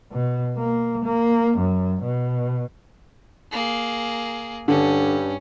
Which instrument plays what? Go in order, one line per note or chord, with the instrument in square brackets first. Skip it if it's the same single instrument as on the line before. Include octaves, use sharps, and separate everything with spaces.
[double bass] B2
A#3
A#3
F#2
B2
[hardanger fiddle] A#3 G#4
[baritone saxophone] G2 [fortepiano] D3 [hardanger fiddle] C#4